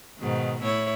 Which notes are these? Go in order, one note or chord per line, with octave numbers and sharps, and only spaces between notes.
G#2 B2 D#3
A2 E4 C#5